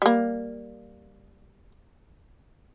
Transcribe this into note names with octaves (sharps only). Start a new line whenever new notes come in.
G3 A#3